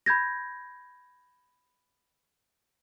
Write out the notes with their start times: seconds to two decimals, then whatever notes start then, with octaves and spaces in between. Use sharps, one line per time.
0.06 B5 G6 G#6 A#6